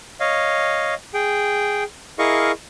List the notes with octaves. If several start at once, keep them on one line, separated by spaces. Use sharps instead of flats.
C#5 D#5 F5
G#4 G5
E4 G#4 A#4 D#5 F5 C#6